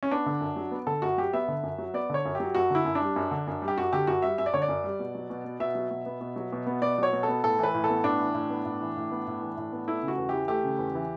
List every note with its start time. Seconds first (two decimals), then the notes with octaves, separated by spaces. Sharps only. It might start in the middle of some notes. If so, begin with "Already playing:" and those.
0.03 C#4
0.11 B3 D4
0.26 D3
0.41 F#2
0.56 F#3
0.71 B3
0.87 D3 A4
1.02 F#2 F#4
1.18 F#3 G4
1.33 B3 E5
1.48 D3
1.63 F#2
1.79 F#3
1.94 B3 D5
2.10 D3 C#5
2.25 F#2
2.35 G4
2.40 F#3
2.55 F#2 F#4
2.70 D3 E4
2.85 F#2
2.95 D4
3.01 G3
3.16 F#2
3.31 D3
3.47 F#2
3.62 G3
3.68 G4
3.78 F#2 F#4
3.93 D3 G4
4.07 F#2 F#4
4.22 G3 E5
4.38 F#2 E5
4.46 D5
4.54 D3 C#5
4.62 D5
4.68 F#2
4.84 G3
5.00 B2
5.15 F#3
5.30 B2
5.44 B3
5.60 B2 E5
5.75 F#3
5.91 B2
6.06 B3
6.21 B2
6.36 F#3
6.52 B2
6.67 B3
6.82 B2 D5
6.98 F#3 C#5
7.13 B2
7.23 A4
7.28 B3
7.44 A2 A4
7.59 E3 B4
7.74 A2
7.84 A4
7.90 B3
8.04 A2 D4
8.20 E3
8.34 A2
8.50 B3
8.65 A2
8.81 E3
8.97 A2
9.11 B3
9.27 A2
9.42 E3
9.57 A2
9.73 B3
9.87 A3 E4
10.03 C#3
10.08 F#4
10.18 E2
10.29 E3 G4
10.48 A3 G4
10.64 C#3
10.79 E2
10.95 E3